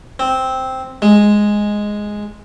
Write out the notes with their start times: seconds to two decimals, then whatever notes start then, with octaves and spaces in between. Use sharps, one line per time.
0.19 C4
1.02 G#3